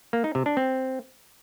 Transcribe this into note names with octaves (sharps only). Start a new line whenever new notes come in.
A#3
D#4
C3
D4
C4